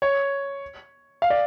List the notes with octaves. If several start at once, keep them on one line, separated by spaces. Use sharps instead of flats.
C#5
F5
D5